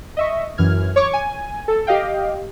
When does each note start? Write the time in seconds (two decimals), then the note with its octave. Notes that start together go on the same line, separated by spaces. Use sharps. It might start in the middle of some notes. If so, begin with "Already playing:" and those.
0.17 D#5 E5 C#6
0.58 F#2 E3 F6 G#6
0.96 C#5 C#6 D6
1.13 G#5
1.68 A4
1.87 G4 D#5 F5 G5